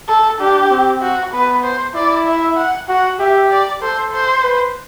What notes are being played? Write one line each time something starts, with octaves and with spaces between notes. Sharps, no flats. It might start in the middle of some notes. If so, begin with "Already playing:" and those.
A4
D4 G4
C4
F#4
B3 B4
C5
E4 D5
E5
F#5
F#4 F#5
G4 E5
D5
A4 C5
C5
B4